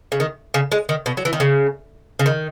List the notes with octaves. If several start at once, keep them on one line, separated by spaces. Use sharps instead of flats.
C#3
D#3
C#3
G#3
D#3
B2
F#3
E3
D#3
C#3
C#3
D#3